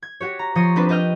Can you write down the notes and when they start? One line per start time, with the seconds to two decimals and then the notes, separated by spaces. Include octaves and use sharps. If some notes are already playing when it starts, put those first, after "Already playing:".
0.02 G#6
0.20 F#4 G4 C#5
0.39 A#5
0.55 F3 C#5 C6 D#6 A#6
0.76 C4 D4 B4
0.89 B4 D#5 G5 F6 G6